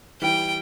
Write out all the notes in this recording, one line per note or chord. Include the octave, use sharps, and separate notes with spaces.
E3 G3 G5